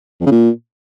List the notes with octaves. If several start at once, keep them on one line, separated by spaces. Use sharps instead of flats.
F2
C#3
A#2